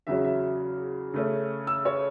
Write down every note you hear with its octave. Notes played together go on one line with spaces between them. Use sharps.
E2 C#3 F#3 C#4 E5
E5
C#3 A3 C#4
E6
C#5